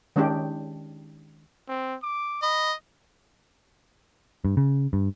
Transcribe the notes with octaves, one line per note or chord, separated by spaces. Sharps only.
D#3 G#3 C#4 D4 G4
C4
D6
D#5 B5
G2
C#3
G2